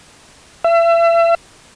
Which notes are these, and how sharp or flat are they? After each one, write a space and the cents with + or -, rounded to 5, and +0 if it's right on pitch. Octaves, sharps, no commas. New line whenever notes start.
E5 +35